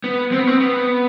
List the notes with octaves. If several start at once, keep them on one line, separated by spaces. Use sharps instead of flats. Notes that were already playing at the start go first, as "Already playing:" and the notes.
B3
C4
B3
C4
B3